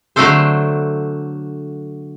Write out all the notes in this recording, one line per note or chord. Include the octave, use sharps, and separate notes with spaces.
D3 F#3 A3 D4 A4 C5